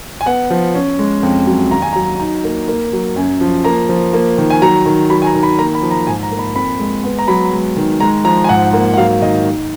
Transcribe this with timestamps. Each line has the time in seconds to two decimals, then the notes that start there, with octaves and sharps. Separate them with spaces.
0.21 G#5
0.26 B3 F#5
0.50 F3
0.75 C#4
0.99 G#3
1.23 F2
1.47 F#3
1.71 D#2 A#5
1.82 G#5
1.93 F#3 A#5
2.20 D#4
2.44 A#3
2.68 A#3
2.93 F#3
3.16 F#2 G#5
3.41 F3
3.64 A#3 A#5
3.89 F3
4.13 A#3
4.38 D#3
4.50 G#5
4.62 F#3 A#5
4.86 D#3
5.10 F#3 B5
5.22 G#5
5.26 A#5
5.34 D#3
5.43 B5
5.58 A#3 A#5
5.75 B5
5.83 F3
5.91 A#5
6.07 G#2 G#5
6.23 A#5
6.31 A#3
6.39 B5
6.55 F2 B5
6.80 G#3
7.04 B3
7.19 A#5
7.28 F#3 B5
7.52 G#3
7.76 D#3
8.00 G#3 A#5
8.25 F3 A#5
8.44 G#5
8.49 G#2 F#5
8.73 A#3
8.94 F#5
8.97 F#3 F5
9.22 D#3 D#5
9.46 D#4